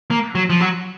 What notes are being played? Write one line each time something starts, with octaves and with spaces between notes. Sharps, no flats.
A#3
F#3
F3
F#3